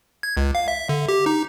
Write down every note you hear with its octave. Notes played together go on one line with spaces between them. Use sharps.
G#6
C#2
F5
E5
D3
G4
D#4